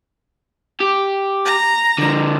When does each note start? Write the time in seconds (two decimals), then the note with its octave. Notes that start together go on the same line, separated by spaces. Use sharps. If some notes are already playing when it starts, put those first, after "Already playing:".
0.80 G4
1.45 A#5
1.98 D3 F3